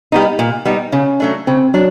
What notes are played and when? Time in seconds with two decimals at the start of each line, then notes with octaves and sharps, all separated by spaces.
0.12 G3 B3 D#4
0.39 A#2
0.65 G3 B3 D#4
0.92 C#3 C#4
1.20 F#3 A3 D4
1.47 C#3 C4
1.74 F#3 D4